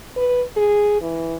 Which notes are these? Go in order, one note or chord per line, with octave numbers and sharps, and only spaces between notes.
B4
G#4
E3